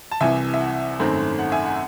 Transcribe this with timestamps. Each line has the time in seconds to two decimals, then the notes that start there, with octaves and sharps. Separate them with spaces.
0.11 A5
0.21 C2 C3 E3 E5 G#5
0.54 E5
0.60 F#5
0.99 G#1 F#2 D#3 A3 C4
1.38 F#5
1.52 E5 G#5
1.65 F#5